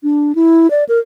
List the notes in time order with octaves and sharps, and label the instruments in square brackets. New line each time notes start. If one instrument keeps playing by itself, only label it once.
[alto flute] D4
E4
D5
A#4